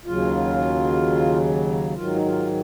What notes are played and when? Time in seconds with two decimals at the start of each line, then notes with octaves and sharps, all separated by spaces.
0.06 D#2 C#3 F#3 F4
1.95 G#2 D#3 F#3 F4
2.15 D#4
2.25 F4